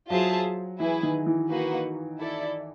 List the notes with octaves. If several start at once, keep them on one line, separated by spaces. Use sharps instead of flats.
F#3 F4 G#4 C5 E5 A5
E3 E4 G#4 B4
D#3
E3
A#3 D#4 F#4 B4
E4 A4 D5